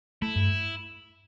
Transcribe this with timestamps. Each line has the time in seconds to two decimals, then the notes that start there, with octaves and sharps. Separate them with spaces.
0.22 A3 E4
0.36 G2